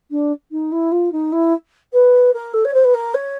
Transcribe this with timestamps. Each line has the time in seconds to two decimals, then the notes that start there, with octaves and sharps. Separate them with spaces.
0.10 D4
0.51 D#4
0.71 E4
0.91 F4
1.12 D#4
1.32 E4
1.92 B4
2.33 A#4
2.53 A4
2.64 C#5
2.73 C5
2.84 B4
2.94 A#4
3.14 C#5